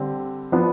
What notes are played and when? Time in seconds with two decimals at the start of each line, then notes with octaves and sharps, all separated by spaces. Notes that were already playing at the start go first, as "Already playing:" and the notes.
Already playing: D3 G3 C4
0.52 F3 B3 D4